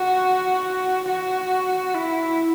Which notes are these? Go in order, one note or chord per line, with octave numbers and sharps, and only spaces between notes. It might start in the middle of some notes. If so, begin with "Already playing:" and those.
Already playing: F#4
F#4
E4